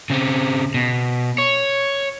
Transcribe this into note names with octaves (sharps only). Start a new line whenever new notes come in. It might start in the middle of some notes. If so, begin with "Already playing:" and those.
C#3 C4
B2
C#5